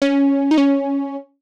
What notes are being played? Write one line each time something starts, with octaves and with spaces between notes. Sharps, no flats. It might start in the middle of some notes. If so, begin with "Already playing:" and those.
C#4
D#4
C#4